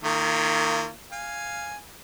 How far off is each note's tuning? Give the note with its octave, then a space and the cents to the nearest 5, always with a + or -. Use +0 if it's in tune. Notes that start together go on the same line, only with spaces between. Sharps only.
D#3 +0 A#3 -30 F4 -40
F5 +0 G#5 +0